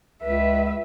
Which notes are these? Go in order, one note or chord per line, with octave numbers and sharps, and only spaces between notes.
C#2 B4 E5